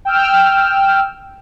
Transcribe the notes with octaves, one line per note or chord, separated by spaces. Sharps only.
G5 E6 F6